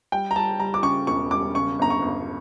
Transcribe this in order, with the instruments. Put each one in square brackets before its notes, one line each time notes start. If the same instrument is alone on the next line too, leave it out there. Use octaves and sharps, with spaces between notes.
[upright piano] G3 G5
A#5
G3 A5
G3 A#5
D6
C#3 C#6
E1 C#6
G3 D6
C#3 C#6
G1 A#5
C#6
G1